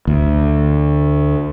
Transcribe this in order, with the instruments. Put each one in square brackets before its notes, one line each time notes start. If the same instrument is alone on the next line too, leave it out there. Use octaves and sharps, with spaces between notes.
[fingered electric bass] D2